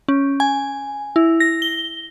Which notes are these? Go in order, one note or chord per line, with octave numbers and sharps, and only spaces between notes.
C#4
G#5
E4
A#6
G7